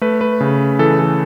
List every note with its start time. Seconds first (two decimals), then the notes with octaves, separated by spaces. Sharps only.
0.01 A3 B4
0.21 B4
0.40 C#3
0.79 E3 A4
0.99 A4